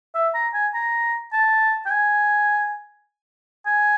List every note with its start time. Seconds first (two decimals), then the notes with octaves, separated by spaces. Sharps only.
0.15 E5
0.34 A#5
0.54 G#5
0.74 A#5
1.33 A5
1.86 G5
1.91 G#5
3.67 G#5